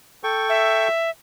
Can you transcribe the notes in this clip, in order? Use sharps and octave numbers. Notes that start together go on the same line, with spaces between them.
A4 G5 C#6
E5